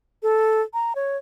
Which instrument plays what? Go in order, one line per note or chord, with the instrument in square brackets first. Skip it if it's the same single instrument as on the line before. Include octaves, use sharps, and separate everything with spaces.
[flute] A4
A#5
C#5